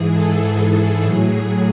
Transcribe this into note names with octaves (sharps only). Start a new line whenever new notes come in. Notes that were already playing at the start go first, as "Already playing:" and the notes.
Already playing: G#2 E3 G#4
A4
A2 F#3 G#4
G#4